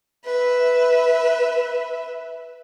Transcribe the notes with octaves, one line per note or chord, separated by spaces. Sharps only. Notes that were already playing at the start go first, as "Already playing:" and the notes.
B4 E5